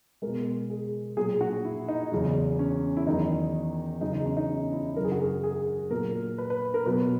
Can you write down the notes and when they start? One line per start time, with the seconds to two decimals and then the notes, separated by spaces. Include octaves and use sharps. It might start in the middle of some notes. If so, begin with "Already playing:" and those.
0.22 G#3 A#4
0.27 B2
0.70 G#4
1.17 A#2 F#3 G#4
1.41 F#4
1.65 E4
1.89 D#4
2.12 E2 C#3 F#3
2.59 C#4
2.97 E4
3.06 E2 D#3 F#3 D#4
4.01 E2 C#3 F#3 D#4
4.13 D#4
4.26 C#4
4.37 D#4
4.73 E4
4.96 F#2 C#3 F#3 A#4
5.04 G#4
5.12 F#4
5.20 G#4
5.44 G#4
5.91 A#2 F#3 A#4
6.38 B4
6.50 B4
6.74 A#4
6.86 B2 F#3 B4